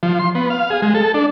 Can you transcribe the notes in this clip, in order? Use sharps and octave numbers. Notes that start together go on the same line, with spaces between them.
F3
C6
B3
F5
G#4
G#3
A4
D4